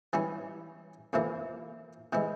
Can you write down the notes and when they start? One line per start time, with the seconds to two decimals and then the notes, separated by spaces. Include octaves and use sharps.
0.13 E3 G3 C#4 E4
1.13 F2 C3 E3 A#3 E4
2.13 C3 E3 G#3 E4